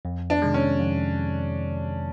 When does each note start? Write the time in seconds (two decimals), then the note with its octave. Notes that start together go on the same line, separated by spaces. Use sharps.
0.05 F2
0.30 D4
0.42 C3 D#3 G#3
0.54 C#4
0.79 F2